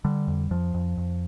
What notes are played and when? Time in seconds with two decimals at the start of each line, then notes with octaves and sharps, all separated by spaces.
0.05 D3 G3
0.28 F2
0.51 F2 F3
0.74 F2
0.97 F2